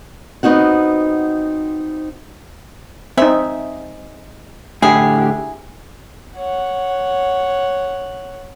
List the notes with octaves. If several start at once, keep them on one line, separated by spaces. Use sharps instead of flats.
B3 C4 D#4 F#4 F#5
G#3 C4 D#4 E5
A2 D3 E4 G4 G#4
C#5 F#5